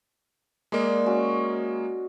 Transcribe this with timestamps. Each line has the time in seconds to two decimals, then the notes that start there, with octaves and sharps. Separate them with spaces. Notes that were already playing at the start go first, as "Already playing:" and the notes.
0.72 G#3 A#3 C5 D5 D#5
1.06 C#4 F#4